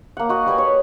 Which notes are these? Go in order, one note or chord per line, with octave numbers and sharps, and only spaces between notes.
A#3 F#5
F#4 D#5
G3 B4 G5 G#5
C#5